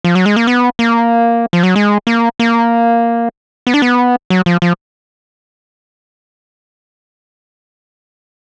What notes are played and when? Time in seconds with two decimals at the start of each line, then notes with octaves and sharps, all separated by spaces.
0.04 F3
0.15 F#3
0.26 G#3
0.36 A#3
0.47 B3
0.79 A#3
1.53 F3
1.63 F#3
1.76 G#3
2.07 A#3
2.39 A#3
3.67 B3
3.74 D4
3.82 B3
4.30 F#3
4.46 F3
4.62 F3